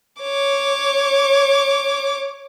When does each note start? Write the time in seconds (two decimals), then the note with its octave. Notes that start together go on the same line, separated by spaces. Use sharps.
0.21 C#5 D6